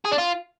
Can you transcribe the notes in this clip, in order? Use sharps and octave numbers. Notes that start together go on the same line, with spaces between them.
G#4
D4
F4